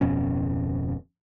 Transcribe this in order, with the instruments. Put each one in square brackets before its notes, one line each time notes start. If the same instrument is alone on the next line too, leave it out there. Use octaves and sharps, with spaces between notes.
[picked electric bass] D1 F2 B2 C#4